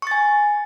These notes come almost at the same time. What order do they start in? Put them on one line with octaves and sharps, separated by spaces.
C#6 A6 G#5